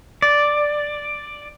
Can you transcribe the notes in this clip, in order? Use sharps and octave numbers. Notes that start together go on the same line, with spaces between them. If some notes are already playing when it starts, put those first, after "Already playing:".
D5